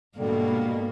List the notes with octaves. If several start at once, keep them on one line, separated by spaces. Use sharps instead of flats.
G#2 B2 D3 G3 A#3